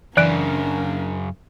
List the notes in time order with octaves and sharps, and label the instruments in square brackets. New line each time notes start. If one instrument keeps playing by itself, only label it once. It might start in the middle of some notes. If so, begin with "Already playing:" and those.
[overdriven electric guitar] F#2 C#3 [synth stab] E3 [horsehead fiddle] D4 A#4 [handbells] D5 F#6 D7